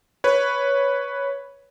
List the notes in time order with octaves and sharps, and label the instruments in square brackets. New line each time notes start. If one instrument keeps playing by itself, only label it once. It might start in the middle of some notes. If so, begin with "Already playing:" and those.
[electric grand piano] B4 C#5